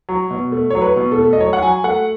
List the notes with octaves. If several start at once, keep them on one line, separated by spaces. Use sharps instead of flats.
F#3
B2
A3
F#3 C#5
B4
B2
A4
A3
D#5
F#3 C#5
F#5
F#3 G#5
A3 F#5